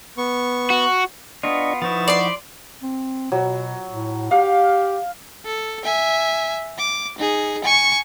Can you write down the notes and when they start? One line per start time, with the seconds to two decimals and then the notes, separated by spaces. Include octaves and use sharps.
0.18 B3 C#6
0.70 F#4
1.43 B3 D4 F4 D#5 C#6
1.82 F3 D#4 E4 B4 F#5 C#6 A6
2.08 D5 C6
2.83 C4
3.32 B2 F#3
3.88 A2
4.31 G4 F5
5.45 A4
5.84 E5 G#5
6.78 D6
7.18 D#4 G#4
7.64 G#5 C#6